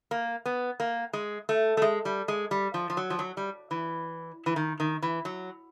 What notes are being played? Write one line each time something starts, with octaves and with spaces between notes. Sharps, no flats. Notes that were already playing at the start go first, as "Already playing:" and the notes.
A#3
B3
A#3
G#3
A3
A3
G#3
G3
G#3
G3
F3
F3
F#3
F3
F#3
G3
E3
E3
D#3
D#3
E3
F#3